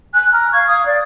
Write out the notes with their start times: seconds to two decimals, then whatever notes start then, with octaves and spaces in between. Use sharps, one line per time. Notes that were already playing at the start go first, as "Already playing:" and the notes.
0.13 G#5 F#6
0.32 A#5 F6
0.51 F5 C#6 G#6
0.67 F5 D#6
0.85 D5